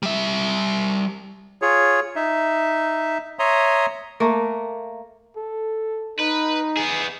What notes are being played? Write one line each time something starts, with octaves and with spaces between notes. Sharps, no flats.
G3 E5
F4 G#4 C#5
D#4 E5
C#5 E5 A#5 C6 D#6
A3 A#3
A4
D#4 B4
B3 G#4